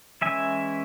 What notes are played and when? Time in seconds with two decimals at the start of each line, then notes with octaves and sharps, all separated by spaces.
0.21 E3 G#3 C#4 E4 E5 G#5